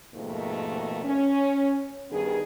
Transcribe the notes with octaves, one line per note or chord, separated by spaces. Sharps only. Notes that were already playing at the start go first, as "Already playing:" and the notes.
F2 G#2 B2 D#3 A3 A#3
C#4
G2 D#3 B3 G#4